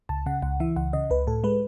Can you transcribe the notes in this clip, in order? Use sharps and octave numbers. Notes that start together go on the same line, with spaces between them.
C#2 A5
C#3 F#5
C#2 F#5
E3 E5
C#2 F#5
C#3 D#5
C#2 B4
A2 A4
G#3 B4